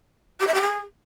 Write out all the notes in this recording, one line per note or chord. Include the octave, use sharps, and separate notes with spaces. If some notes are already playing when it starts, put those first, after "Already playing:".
G4
E5
G4
G#4